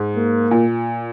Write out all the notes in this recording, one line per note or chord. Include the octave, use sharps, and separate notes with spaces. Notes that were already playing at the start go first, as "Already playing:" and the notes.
Already playing: G#2
A#3
A#2